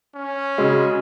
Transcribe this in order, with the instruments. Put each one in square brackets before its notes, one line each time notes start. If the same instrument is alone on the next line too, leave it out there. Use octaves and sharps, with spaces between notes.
[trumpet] C#4
[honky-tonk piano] C#3 G#3 [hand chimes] F#4